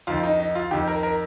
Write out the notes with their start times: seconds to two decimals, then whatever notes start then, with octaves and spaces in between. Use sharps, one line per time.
0.07 F2 D#3 F4
0.23 D#4
0.39 D#4
0.55 F4
0.71 F2 D#3 G4
0.88 A#4
1.03 A#4